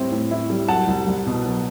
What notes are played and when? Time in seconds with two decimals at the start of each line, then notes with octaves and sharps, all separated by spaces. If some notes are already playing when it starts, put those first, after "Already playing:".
Already playing: A2 G3 C4 E4
0.11 A2
0.31 E4
0.50 G3
0.68 F#3 F#5 A5
0.87 C2
1.07 C2
1.26 B2
1.45 F#3